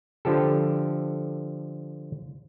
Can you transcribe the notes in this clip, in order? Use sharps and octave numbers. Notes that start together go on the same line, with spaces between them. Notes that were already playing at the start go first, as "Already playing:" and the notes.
D3 F3 G4 A4